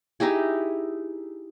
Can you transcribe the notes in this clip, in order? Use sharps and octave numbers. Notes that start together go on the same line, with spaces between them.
D#4 E4 G4 G#4